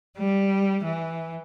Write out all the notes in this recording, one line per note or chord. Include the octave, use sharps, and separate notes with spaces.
G3
E3